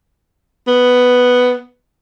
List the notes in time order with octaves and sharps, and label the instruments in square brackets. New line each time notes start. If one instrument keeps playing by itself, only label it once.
[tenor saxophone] B3